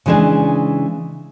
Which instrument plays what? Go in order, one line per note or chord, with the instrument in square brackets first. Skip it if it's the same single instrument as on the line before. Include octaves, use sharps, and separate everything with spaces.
[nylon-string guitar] C#3 E3 G#3 D4 G#4